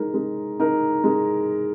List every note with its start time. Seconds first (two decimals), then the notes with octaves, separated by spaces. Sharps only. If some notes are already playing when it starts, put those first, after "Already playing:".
Already playing: G#3 D#4 A#4
0.14 G#3
0.60 D#4 A#4
1.04 G#3